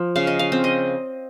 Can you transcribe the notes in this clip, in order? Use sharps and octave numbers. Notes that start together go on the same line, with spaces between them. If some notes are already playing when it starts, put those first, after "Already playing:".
Already playing: F3
C#3 F5
D#5
F5
C4
D#5